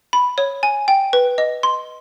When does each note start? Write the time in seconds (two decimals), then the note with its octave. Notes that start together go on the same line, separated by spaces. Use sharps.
0.13 B5
0.38 C#5
0.63 G#5
0.88 G5
1.13 B4
1.38 D#5
1.63 C6